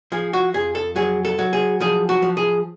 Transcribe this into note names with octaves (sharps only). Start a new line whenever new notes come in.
F3 G#4
F#4
F2 G#4
A4
F#3 G#4
A4
F#3
G#4
F3 G#4
F#4
F3
G#4